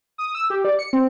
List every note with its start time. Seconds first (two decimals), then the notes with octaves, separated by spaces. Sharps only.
0.18 D#6
0.35 E6
0.50 G4
0.65 D5
0.79 C#7
0.93 C4